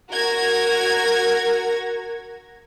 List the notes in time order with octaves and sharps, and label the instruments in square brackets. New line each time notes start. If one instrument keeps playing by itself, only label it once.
[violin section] F#4 A#4 G#6 A#6